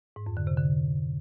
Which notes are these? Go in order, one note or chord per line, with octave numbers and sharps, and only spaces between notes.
G#2
F2
D3
C3
D3